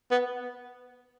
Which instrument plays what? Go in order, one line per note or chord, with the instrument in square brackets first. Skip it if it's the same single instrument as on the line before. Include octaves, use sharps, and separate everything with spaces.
[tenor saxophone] B3